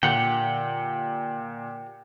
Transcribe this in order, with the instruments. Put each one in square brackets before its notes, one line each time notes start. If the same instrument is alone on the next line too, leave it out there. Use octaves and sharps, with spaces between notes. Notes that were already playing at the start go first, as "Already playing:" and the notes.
[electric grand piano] A#2 [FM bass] D3 [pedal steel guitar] G4 F#5 G5